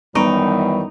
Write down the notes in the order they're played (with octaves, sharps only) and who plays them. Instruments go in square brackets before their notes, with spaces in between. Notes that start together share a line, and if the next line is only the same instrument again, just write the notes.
[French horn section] F#2 D#3 E3 [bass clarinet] G3 [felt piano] B3 C#6 D7 [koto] D#4